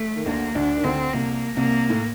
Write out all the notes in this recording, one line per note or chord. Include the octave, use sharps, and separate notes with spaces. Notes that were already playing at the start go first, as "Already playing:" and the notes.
Already playing: A3
D#3
D2 D3 A#3
D2 D3 D4
D#3
D2 D3 C4
C2 C3 A#3
C2 C3 A#3
A2